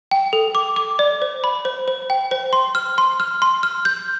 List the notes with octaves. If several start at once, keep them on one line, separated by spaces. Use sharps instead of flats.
G5
A4
D6
D6
D5
C5
B5
C5
C5
G5
C5
C6
F6
C6
F6
C6
F6
G6